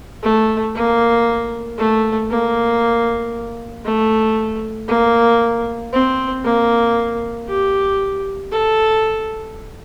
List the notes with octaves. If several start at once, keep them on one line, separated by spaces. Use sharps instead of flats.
A3
A#3
A3
A#3
A3
A#3
C4
A#3
G4
A4